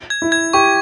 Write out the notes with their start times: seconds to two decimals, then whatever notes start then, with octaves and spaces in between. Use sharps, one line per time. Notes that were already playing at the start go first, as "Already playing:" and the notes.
0.10 G#6
0.22 E4
0.32 G#6
0.53 G4 C#6